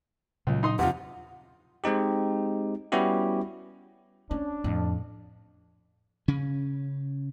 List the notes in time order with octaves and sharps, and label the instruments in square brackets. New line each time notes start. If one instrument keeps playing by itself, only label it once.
[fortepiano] C#2 [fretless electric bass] A#2 C#3 F#3
[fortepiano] D#4 C6 D#6
[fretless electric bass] E2 [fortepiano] C3 F3 F4 [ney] F#5
[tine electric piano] G#3 C4 D#4 G4
G3 B3 C#4 E4 F#4 G4
[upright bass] C#4 [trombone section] D4
[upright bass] F2 [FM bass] A2
[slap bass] C#3 C#4